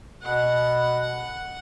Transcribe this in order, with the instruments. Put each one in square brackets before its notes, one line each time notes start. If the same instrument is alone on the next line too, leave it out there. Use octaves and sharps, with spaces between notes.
[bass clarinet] B2 [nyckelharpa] F#5